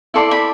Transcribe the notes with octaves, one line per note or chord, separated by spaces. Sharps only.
E4 A4 D5 C6
B5